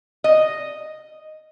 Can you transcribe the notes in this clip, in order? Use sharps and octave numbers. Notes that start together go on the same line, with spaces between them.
D#5